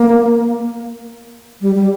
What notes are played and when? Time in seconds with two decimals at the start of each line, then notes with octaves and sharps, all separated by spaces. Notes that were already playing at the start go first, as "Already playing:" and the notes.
Already playing: A#3
1.61 G3
1.75 G3